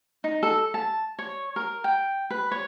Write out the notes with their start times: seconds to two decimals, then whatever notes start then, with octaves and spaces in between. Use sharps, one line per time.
0.24 D#4
0.43 A4
0.74 A5
1.19 C#5
1.56 A#4
1.84 G5
2.30 B4
2.51 C#5